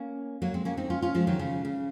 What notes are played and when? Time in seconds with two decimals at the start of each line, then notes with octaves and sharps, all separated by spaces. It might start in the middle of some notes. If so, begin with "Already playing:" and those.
Already playing: A#3 C#4
0.42 F#3 A#3
0.54 G#3 C4
0.65 A#3 C#4
0.77 C4 D#4
0.90 C#4 F4
1.02 C#4 F4
1.14 F3 G#3
1.27 D#3 F#3
1.39 C#3
1.65 C#3